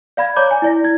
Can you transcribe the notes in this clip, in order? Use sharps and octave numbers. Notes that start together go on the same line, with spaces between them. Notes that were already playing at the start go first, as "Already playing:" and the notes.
D5 F5 B5 G#6
C#5 D5 A#5 D6 G6
G#5
E4 D5 A#6
E4 G#6